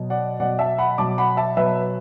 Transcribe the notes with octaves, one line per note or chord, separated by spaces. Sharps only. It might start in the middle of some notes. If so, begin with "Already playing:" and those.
Already playing: B2 F#3
D5 F#5
B2 F#3 D5 F#5
E5 A5
F#5 B5
B2 F#3 A5 D6
F#5 B5
E5 A5
B2 F#3 B4 E5